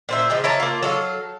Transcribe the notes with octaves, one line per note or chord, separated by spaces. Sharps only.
A#2 C5 E5
F3 G#3 G4
E4 A#4 C#5 A5
A#3 F4
F#3 A4 F5